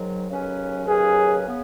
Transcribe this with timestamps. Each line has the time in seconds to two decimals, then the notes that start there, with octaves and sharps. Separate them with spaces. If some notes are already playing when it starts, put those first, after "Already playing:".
Already playing: G#2 D#3 F#3
0.29 D#2 C#3 F#3 C#4 B4
0.87 D#2 C#3 F#3 C#4 G#4 B4
1.47 C#3 B3